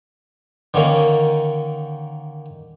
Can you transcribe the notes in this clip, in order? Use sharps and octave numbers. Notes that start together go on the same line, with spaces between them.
D3 D#3 A#3 C#4